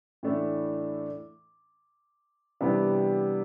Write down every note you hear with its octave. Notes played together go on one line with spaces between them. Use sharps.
A2 E3 A3 D4
C3 E3 G3 B3 D4